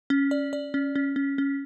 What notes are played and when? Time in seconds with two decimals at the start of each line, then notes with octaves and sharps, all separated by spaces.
0.10 C#4
0.31 D5
0.53 D5
0.74 C#4
0.96 C#4
1.16 C#4
1.38 C#4